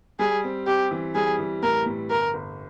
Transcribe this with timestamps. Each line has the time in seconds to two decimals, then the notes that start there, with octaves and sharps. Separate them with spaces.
0.19 G3 G#4
0.44 C4
0.67 C4 G4
0.91 E3
1.15 G3 G#4
1.39 E3
1.63 A2 A#4
1.86 A2
2.10 G1 A#4
2.34 G1